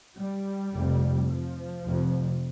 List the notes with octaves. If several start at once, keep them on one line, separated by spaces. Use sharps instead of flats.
G3
F1 F2 C3
F3
F1 F2 C3